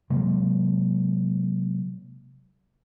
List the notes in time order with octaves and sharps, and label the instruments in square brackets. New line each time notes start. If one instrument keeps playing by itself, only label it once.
[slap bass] C3 F#3 G#3 A#3